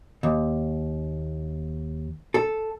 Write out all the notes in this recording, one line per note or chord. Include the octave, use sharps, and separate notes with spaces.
D#2
A4